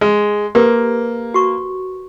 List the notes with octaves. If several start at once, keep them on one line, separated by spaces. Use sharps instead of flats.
G#3
A#3 G4 A#4 B4
F#4 C#6